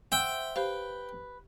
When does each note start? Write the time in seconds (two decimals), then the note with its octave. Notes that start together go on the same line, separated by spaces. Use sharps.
0.12 C5 E5 F#5 G5
0.56 G4 B4 C5 F5